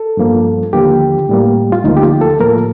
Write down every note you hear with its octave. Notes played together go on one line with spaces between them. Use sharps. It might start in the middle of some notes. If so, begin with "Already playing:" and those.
Already playing: A4
G2 F3 A#3
D#2 D3 F3 A#3 G4
A2 G3 A#3
F4
D2 D3 F3 A#3 D#4
G4
F4
A4
A2 F3 A#3 A#4